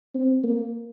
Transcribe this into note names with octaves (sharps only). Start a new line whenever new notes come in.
C4
A#3